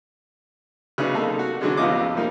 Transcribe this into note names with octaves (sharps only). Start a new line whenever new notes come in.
C#3 F#3 B3 D4 D#4
C3 G#3 A#3 D#4 A4
F#4
D3 E3 F#3 G#3 C#4 D4
A1 F2 B3 F4 D#5 D6
F3 G3 A#3 D#4